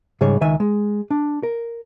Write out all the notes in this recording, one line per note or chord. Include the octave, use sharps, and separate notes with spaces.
G#2 C#3 G3 G#4 C#5
C#2 D#3 E5 G#5
G#3
D4
A#4